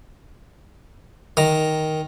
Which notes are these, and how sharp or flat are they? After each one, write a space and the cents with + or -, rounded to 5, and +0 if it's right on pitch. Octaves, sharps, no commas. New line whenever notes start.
D#3 +5 A#5 +0